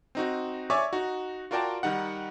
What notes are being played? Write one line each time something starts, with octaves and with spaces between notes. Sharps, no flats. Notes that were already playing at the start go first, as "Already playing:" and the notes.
C4 D#4 F#4
C#5 D5 E5 G#5 C#6 D6
D#4 F#4
F4 F#4 A#4 D5 G5 A5
D#3 G3 D#4 F#5